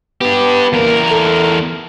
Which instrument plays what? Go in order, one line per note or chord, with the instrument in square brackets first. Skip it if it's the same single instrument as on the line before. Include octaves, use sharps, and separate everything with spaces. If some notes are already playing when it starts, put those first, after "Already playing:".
[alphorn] B3 [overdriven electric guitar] D4 G4
[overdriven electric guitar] E2 A#4 [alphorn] A#3
[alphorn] A4